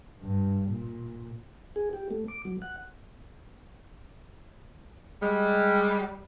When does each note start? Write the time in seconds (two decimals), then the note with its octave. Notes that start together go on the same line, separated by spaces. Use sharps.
0.20 G2
0.71 A#2
1.76 G#4
1.93 G4
2.11 A3
2.28 D6
2.45 F#3
2.62 F#5
5.22 G3 G#3